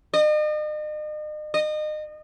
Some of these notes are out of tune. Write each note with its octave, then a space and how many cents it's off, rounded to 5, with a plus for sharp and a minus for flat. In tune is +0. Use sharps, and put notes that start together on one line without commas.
D#5 -40
D#5 -30